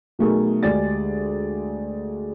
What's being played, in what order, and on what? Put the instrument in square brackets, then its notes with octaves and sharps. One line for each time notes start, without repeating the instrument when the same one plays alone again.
[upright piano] B2 F#3 A3 D#4 G#4 A#4
D2 G#3 G4 G#4 D5 A6